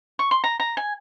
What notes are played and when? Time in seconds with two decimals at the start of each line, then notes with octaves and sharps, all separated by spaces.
0.19 C#6
0.31 C6
0.44 A#5
0.60 A#5
0.77 G#5